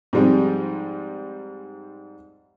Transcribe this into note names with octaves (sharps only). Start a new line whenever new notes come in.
G#2 F3 G3 G#3 C4